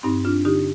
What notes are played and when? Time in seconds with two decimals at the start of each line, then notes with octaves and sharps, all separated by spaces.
0.03 G2 C4 D#4
0.25 D4 F4
0.45 D3 D#4 G4